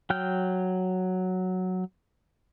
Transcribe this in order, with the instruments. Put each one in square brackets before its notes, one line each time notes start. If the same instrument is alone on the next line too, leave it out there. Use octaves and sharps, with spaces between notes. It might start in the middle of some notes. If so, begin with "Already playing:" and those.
[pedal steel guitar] F#3 G5 F6 G6